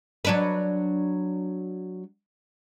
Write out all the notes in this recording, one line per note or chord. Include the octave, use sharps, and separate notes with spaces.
F#3 D4 B4